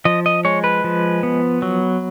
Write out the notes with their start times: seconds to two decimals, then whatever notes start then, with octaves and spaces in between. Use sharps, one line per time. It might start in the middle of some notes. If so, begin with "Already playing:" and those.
0.05 F3 D#5
0.26 D#5
0.45 G#3 C#5
0.64 B4
0.84 F3
1.23 B3
1.62 F#3